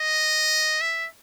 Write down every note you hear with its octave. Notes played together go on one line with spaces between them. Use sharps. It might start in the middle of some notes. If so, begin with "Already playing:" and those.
Already playing: D#5
E5